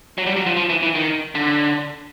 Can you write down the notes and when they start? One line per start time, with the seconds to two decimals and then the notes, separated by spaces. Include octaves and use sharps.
0.18 F#3
0.26 G3
0.36 F#3
0.46 F3
0.57 F3
0.69 E3
0.83 E3
0.95 D#3
1.35 D3